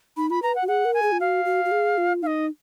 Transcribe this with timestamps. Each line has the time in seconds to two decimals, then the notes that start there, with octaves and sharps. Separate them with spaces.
0.17 D#4 B5
0.30 F4 B5
0.42 B4 A#5
0.55 F#5
0.62 F#4
0.68 G#4 F#5
0.85 A#4
0.94 G#5
1.02 G#4
1.12 F4
1.20 F#4 F5
1.45 F#4
1.65 F#4
1.71 G#4
1.98 F4
2.22 D#4 F5
2.27 D#5